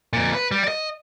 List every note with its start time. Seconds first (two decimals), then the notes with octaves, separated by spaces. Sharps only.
0.13 F2 A#2
0.34 B4
0.51 G3
0.63 D5 D#5